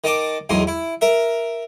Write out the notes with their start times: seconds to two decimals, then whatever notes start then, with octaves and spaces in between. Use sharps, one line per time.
0.04 D#3 D#5 A5 D6
0.49 B1 E2 G#2 C6 D#6
0.67 E4
1.01 A#4 E5